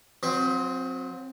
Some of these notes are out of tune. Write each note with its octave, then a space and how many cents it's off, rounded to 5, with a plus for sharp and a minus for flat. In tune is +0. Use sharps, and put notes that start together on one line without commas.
F#3 -35 C4 +0